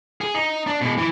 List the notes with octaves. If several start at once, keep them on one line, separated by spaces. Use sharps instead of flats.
G#4
D#4
D4
B2 G#3
E3